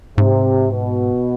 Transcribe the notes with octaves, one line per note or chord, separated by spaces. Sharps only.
G#2 C3
B2